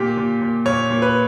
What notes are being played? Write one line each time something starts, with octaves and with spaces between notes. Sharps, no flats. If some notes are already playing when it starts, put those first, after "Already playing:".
Already playing: A#2 G4
A#2
A#2
A#2 C#5
A#2
B4